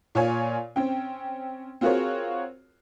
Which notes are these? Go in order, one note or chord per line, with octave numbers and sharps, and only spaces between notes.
A#2 F4 C#5 G#5
C4 C#4 G5
C4 F4 F#4 G#4 A#4 C#5